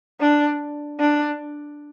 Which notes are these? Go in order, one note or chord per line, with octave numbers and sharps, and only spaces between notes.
D4
D4